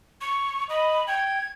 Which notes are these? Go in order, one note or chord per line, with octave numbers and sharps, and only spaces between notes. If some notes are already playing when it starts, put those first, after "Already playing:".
C#6
D#5 B5
G5 G#6